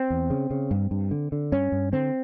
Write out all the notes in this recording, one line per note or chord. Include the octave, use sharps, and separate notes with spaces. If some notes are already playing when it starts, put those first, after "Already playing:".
Already playing: C4
E2
C#3
C#3
G2
G2
D3
D3
G2 C#4
G2
D3 C4